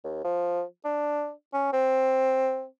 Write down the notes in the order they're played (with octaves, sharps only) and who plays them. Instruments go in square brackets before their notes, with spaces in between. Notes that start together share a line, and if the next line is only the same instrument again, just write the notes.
[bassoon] D#2
F3
D4
C#4
C4